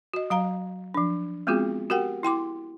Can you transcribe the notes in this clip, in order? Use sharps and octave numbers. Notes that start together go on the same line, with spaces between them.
F#4 D#5
F#3 F5 A#5
F3 D4
G#3 B3 C4 F4 F#4 G#4
F#4 G4 A#4 F#5 G5
E4 G5 C6 D6